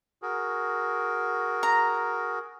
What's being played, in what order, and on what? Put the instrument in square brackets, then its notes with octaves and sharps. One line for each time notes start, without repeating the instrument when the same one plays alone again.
[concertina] F#4 G#4 A#4
[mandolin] A#5